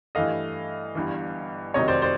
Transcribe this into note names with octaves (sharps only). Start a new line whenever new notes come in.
G2 E3 A3 D#5 F5
G1 G2 E3
F1 F2 C3 D#3 F#3 C#5 D#5
C5 D5
C5 D5